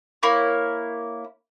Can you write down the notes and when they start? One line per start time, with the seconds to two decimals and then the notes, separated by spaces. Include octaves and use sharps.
0.23 A#3 E4 C#5